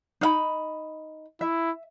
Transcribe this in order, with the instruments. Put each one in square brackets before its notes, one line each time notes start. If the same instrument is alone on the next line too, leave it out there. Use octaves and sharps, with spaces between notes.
[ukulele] D#4 F5 B5
[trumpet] E4 [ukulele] E5